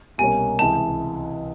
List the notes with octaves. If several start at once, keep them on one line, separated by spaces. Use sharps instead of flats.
C2 B2 G3 A#3 C#4 G#5
C#2 C3 E3 G#3 A5